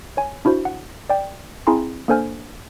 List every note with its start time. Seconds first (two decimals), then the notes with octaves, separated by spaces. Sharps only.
0.17 C#5 G#5
0.45 D4 E4 F#4 C5
0.65 F#5
1.10 D5 G5
1.67 C4 E4 G#4 G#5 A#5 C6
2.08 A#3 D4 A4 C5 G#5 F6